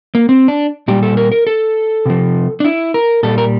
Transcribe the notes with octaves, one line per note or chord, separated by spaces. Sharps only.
A#3
C4
D4
A#2 G3 G4
A4
A#4
A#4
A4
C3 F3
D4
E4
A#4
A#2 G3 A4
A#4